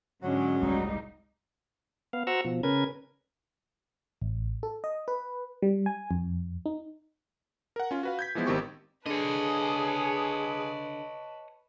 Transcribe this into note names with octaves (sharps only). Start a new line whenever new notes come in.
G#2 D3 F#3 G#3 C#4
F#1 C2 G3 G#3 D#4
B3 F5
F#4 C5 F#5 A#5 C#6 E6
B2 F3
C#3 C#4 A#4 B4 G#6
A1
A4
D#5
B4
G3
G#5
F2
D#4
A#4 F#5
C#4 F4
F#4 B4 F5
G6 G#6 B6
E3 F3 G#3 B3 E4
G#1 D#3 C4 G4 C#6
D3 G#4 B4 C#5 D#5 A5